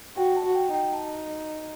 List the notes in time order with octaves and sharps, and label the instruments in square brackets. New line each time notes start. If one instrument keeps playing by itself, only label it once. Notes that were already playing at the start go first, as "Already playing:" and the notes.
[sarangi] F#4 [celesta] G5
[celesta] A5
[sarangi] F#4
[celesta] G5
[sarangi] D#4 [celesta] G5
[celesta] A5